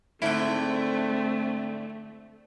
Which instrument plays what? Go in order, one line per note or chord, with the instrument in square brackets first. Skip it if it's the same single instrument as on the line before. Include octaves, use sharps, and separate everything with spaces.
[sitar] G#2 D3 [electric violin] A3 [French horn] C4 [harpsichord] E4 G5